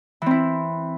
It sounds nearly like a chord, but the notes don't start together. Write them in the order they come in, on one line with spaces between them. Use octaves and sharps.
E3 C4 E4